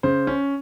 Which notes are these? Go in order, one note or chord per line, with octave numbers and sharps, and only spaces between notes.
C#3 C5
C#4